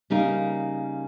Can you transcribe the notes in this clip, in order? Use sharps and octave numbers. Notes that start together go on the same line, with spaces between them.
C#3 G3 A#3 D#4 A#4